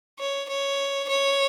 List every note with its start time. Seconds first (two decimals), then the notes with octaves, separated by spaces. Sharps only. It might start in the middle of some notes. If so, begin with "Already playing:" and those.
0.19 C#5
0.49 C#5
1.09 C#5